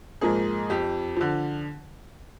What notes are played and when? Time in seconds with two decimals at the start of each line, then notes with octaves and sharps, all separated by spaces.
0.21 G#2 F3 A#3 G#4
0.70 F2 G4
1.16 D3 F3